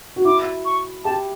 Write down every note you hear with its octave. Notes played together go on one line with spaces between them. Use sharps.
F#4
E4 D6
C#6
G4 A5